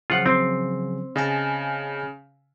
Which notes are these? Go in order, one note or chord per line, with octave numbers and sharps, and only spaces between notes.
C#3 F3 F#3 F4 F#5
C4
C#3 D#5 G#5 A5